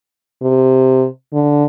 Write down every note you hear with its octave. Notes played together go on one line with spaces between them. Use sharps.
C3
D3